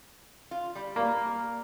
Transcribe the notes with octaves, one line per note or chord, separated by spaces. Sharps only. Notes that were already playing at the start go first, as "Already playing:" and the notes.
F4
G3
A#3